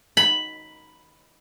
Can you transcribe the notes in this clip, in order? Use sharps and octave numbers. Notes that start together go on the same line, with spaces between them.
B5